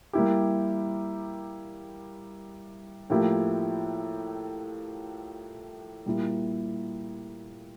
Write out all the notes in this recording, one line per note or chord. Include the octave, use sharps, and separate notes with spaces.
G3 A#3 E4 G4
A2 F3 A#3 E4 G4
A#2 G3 A#3 E4